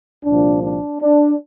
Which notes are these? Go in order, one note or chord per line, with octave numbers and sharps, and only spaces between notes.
C2 A#2 F3 D4
D4
D4